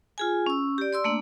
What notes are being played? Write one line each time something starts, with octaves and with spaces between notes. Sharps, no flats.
F4 G#4 G#5
C#4 E6
G4 D5
D5 C6 E6
A3 A#3 D4